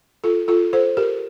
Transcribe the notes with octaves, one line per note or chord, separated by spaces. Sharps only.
F4 A4
F4 A4
A4 C5
G4 A#4